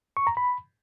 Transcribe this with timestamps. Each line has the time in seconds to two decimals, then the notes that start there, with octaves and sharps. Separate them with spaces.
0.17 C#6
0.27 A#5
0.37 B5